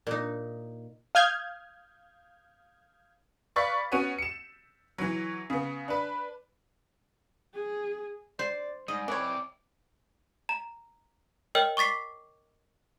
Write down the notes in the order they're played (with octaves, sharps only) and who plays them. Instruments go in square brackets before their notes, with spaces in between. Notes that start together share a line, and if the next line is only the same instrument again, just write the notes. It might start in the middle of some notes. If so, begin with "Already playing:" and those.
[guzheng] A#2 D#4
[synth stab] F5 D#6 F6 G6 G#6
[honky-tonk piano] B4 D5 F5 C#6 A6 B6
B3 C#4 F#4 D#7
C#7 E7
E3 F#3
C#3 B3
D4 B4
[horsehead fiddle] G#4
[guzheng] C5 [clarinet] D5
[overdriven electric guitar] G#2 [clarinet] G3 [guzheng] D#5
[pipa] E3 C#5 [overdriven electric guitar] C4 D5 [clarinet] D6
[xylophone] A#5
A#4 C#5 D#5 G5 F6
C#6 D6 A6 B6 C7